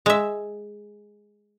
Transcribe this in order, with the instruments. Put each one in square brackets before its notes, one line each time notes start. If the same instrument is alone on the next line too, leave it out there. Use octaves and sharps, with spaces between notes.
[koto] G#3 E5